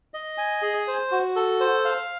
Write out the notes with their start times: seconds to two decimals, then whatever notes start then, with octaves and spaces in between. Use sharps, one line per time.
0.14 D#5
0.38 G#5
0.62 G#4
0.88 C5
1.11 F#4
1.36 A4
1.60 C5
1.85 F5